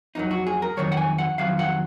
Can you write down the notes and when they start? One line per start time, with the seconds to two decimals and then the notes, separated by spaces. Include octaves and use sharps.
0.15 F2 D#3 F#3 D#4
0.31 F#4
0.47 G#4
0.62 A#4
0.77 F2 D#3 F#3 C#5
0.92 F#5
0.97 G#5
1.18 F#5
1.38 F2 D#3 F#3 F5
1.59 F#5